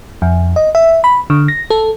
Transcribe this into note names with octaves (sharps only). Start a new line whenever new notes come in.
F2
D#5
E5
B5
D3
A#6
A4